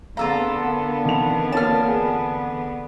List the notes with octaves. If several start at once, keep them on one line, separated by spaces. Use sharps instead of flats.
D3 B3 C4 F4 G#4 A4 F5 A#5
A#4 F#5
D#3 E3 C4 F7
A#3 F4 C#5 A5 F6
G#4